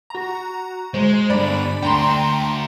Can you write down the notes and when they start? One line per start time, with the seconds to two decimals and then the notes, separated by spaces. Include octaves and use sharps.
0.10 F#4 A#5
0.94 G#3 C5
1.30 G2 D3 D5 B5
1.83 A3 D4 G5 A#5 C6